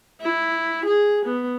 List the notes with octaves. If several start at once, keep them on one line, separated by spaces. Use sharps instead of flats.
E4
G#4
B3